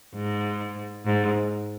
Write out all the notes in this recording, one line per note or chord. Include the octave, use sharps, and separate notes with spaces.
G#2
G#2